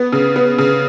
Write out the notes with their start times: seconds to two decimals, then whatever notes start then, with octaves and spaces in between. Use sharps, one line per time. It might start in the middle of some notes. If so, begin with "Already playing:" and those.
Already playing: B3
0.12 C#3
0.36 B3
0.58 C#3